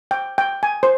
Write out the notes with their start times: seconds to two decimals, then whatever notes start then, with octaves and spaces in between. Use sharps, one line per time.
0.11 G5
0.38 G5
0.63 G#5
0.83 C5